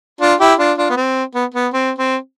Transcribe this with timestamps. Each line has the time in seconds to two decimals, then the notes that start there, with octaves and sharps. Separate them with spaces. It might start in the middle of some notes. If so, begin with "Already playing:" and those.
0.21 D4 F4
0.40 E4 G4
0.58 D4 F4
0.78 D4 F4
0.90 B3
0.97 C4
1.35 B3
1.54 B3
1.73 C4
1.98 C4